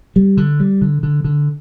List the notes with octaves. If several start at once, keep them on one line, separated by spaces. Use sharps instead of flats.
G3
D3
G3
D3
D3
D3